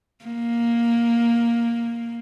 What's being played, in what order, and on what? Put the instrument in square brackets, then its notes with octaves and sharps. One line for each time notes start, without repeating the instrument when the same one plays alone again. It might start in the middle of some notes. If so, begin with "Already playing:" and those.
[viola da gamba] A#3